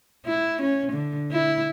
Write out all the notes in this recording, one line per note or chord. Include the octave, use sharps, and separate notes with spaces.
E4
C#4
D3
E4